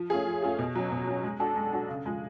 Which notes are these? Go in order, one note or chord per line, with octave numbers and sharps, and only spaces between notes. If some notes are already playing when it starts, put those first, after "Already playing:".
Already playing: F3
A3 C#4 F4 G#4
F3
A3 C#4 F4 G#4
B2
F#3 C#4
B2
F#3 C#4
G#3
D4 F#4 A4
G#3
D4 F#4 A4
C#3
F3 G#3